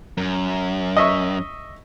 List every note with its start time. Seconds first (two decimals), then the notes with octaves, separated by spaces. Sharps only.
0.17 F#2
0.97 D#5 E5 C#6